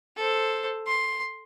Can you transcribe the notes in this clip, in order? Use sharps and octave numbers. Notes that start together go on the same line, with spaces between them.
A4 C5
C6